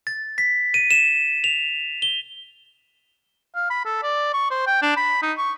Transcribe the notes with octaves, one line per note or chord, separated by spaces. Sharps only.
A6
B6
D#7
E7
F7
G7
F5
B5
A4
D5
C#6
C5
G5
D4
B5
D#4
C#6